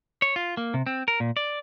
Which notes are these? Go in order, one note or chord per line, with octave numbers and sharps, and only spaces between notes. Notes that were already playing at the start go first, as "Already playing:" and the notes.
C#5
F4
A#3
C3
C4
A#4
A#2
D5